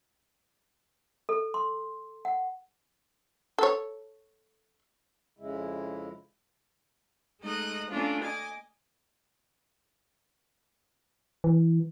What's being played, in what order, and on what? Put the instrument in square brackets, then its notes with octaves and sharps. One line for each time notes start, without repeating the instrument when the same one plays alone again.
[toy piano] A4
C6
F#5
[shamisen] A4 C#5
[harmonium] F2 C#3 G#3 E4
[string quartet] G#3 A3 D#4 D#5 F#6
A3 A#3 C#4 D4 F4
D#5 G#5 D6
[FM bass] E3